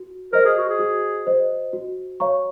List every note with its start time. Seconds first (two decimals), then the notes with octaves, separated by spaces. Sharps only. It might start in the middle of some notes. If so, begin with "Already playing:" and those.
Already playing: F#4
0.33 A#4 C5 D#5
0.45 G#4
0.57 F#4
0.69 G#4
0.79 F#4
1.27 C5 D#5
1.73 F#4
2.20 C#5 F5 A#5 C#6